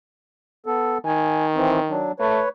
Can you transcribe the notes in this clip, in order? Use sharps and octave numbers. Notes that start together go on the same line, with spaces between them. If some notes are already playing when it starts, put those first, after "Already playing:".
B3 A4
D#3 G#5
E3 C4
F#3 D4
A3 B4 C#5